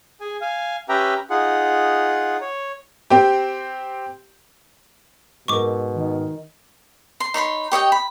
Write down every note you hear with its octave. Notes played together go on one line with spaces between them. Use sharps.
G#4 G#5
F5 G#5
C#4 G4 B4 E5 G5 A#5
D#4 F4 G#4 F#5
C#5
C4 G4
G#2 B2 A#4 C#6 D6
D#3
C6
D#4 C#5 B5 C6
G4 C#5 D#5 G5
B5